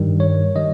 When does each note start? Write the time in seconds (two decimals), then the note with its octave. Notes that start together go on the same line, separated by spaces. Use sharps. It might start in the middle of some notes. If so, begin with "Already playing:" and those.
Already playing: G2 D#3 G3
0.20 C#5
0.56 D#3 G3 D#5